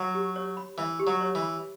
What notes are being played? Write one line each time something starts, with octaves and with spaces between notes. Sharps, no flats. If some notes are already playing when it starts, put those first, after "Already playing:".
Already playing: F#3
G4
C#5
B5
E3 E5
G4
F#3
C#5
E3
B5